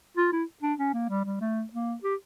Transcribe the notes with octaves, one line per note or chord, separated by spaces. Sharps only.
F4
E4
D4
C#4
A#3
G3
G3
A3
A#3
G4